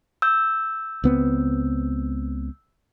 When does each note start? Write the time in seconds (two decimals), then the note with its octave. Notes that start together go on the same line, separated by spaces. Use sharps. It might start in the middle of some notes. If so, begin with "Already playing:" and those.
0.22 E6 G6
1.04 C#2 B3 C4